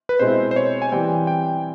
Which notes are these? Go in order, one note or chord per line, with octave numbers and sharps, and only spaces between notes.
B4
B2 G#3 C4 E4 C5
C5
C#5
G#5
E3 G3 C4 G5
G5